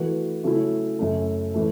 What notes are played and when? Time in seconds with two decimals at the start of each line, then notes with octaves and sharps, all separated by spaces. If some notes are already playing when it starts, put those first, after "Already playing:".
Already playing: E3 A3 F#4 B4
0.43 C#3 F#3 A3 C#4 E4
0.99 F#2 C#3 A3
1.54 A2 E3 A3